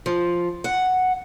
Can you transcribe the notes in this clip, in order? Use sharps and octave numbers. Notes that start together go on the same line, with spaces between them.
F3
F#5